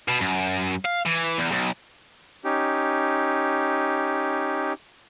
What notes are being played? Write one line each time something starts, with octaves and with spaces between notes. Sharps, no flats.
B2
F#2
F5
E3
E2
B1
C#4 D#4 G4